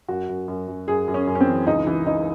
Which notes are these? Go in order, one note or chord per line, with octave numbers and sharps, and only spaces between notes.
F#2 F#4
F#2
F#2
F#2
F#2 G#4
F#2
C#4
F#2
C#4
C4
E3
C#2 D#4
E3
E3 D#4